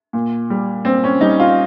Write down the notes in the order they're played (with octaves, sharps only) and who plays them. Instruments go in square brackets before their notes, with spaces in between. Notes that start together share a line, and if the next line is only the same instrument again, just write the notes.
[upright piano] A#2
G3
A#2 C4
C#4
G3 D#4
F4